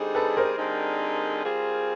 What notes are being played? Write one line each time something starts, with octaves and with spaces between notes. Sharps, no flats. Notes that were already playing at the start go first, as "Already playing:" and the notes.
Already playing: D3 G3 C4 D#4 G#4
A4 B4
A#4 C5
D3 G3 C4 D#4 G#4
G3 C4 F4 G#4